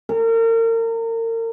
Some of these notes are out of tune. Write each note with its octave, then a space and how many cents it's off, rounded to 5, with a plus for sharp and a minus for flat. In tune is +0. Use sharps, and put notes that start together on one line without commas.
A#4 -35